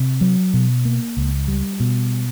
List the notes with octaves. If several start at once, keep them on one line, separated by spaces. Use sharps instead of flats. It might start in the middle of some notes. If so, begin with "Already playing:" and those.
Already playing: C3
F#3
B2
A#3
C#2
G3
B2